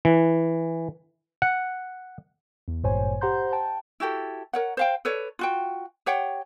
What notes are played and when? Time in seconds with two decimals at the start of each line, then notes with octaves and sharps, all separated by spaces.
0.05 E3
1.42 F#5
2.68 E2
2.83 G#1 G2 A#2 C5 C#5 G#5
3.21 G4 C5 F#5 A#5 C6 G6
3.52 G5 A5
4.00 E4 F#4 G4 A4
4.53 A#4 C#5 F#5
4.77 C5 F5 G5
5.05 A4 B4 C#5 D5
5.39 F4 F#4 G5
6.06 G4 C#5 F#5 G5